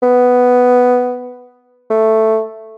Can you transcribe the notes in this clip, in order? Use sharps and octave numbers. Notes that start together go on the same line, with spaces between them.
B3
A3